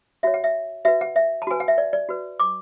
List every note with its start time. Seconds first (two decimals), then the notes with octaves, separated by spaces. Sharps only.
0.23 F#4 C#5 E5
0.34 F#5
0.44 E5
0.85 F#4 B4 E5
1.01 F#5
1.16 E5
1.42 A5
1.47 F#4 B4 G#5
1.60 F#5
1.68 E5
1.78 D5
1.93 D5
2.09 F#4 B4
2.40 D6